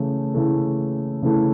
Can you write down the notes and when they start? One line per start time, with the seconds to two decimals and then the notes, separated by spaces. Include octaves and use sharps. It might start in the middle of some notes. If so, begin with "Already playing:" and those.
Already playing: C#3 E3 A3
0.35 C#3 E3 A3
1.22 C#3 E3 A3